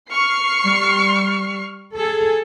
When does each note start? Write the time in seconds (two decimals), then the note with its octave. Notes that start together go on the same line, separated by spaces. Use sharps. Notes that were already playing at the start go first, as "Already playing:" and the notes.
0.11 C#6 F6 C7
0.65 G3
1.95 G#4 A4